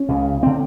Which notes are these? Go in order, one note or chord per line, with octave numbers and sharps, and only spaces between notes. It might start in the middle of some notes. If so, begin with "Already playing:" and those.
Already playing: C#4
C#2 C#3
D3 C4